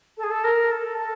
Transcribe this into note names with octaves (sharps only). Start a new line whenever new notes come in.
A4
G#4
A4
A#4
A4
A4